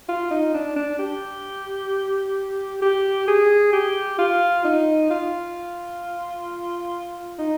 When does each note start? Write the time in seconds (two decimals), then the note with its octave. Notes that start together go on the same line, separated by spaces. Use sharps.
0.09 F4
0.31 D#4
0.54 D4
0.76 D4
0.99 G4
2.82 G4
3.27 G#4
3.73 G4
4.18 F4
4.64 D#4
5.10 F4
7.38 D#4